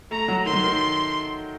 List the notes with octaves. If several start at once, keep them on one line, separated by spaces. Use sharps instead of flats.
A3 A#5
F#3
D#3 C6
F#3
D#3